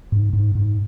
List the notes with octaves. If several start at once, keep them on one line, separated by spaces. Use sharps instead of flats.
G#2
G#2
G#2